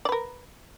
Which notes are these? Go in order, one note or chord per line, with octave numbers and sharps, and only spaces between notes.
A#4 B4 D5